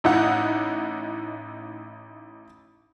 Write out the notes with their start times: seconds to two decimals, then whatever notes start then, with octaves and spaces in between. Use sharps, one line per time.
0.04 A1 D#4 E4 F#5